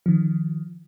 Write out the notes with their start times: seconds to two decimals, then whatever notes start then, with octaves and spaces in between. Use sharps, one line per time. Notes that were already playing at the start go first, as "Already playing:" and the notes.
0.06 D#3 F3